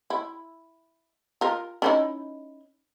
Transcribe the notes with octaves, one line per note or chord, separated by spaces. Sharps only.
E4
F4 A#4
C#4 D#4 E4